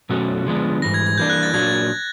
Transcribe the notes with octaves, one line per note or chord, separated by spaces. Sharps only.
B2 F#3 A3 C#4 F#4
D3 F3 G#3 B3 D4
G#2 E3 G3 A#6
G#6
G#6
E3 G3 A#3 D4 G6
F#6
A6
A#2 F#3 A#3 D4 G#6